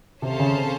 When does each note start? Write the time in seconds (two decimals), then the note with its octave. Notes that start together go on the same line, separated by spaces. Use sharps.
0.22 C3 C#4 A4 C5 F5 A5
0.39 C#3
0.56 C4